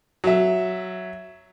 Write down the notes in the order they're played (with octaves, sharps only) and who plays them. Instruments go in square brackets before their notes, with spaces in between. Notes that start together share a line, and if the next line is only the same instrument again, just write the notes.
[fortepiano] F#3 E5